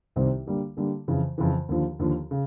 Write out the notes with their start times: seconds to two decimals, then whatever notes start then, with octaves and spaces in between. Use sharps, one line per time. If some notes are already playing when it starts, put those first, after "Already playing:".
0.16 C2 C3 D#3 G3 C4
0.47 D3 G3 A#3
0.77 D3 G3 A#3
1.08 F2 C#3 E3
1.38 F2 C#3 E3
1.69 D#2 D3 F3
1.99 D#2 D3 F3
2.31 C#3